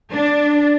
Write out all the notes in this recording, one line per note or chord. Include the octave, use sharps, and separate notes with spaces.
D4